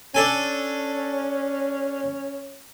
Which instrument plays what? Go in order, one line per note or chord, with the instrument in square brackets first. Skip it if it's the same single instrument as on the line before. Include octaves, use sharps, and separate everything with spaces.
[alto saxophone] C#4 [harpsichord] D4 A4 G#5